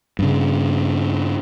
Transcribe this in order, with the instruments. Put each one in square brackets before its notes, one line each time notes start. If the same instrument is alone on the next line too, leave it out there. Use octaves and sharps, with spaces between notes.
[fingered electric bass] G2 C#3